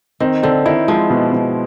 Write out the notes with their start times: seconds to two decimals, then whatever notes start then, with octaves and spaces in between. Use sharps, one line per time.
0.20 D#3 C4
0.43 D3 C4
0.66 D#3 E4
0.88 F3 G#3
1.10 B2
1.33 B2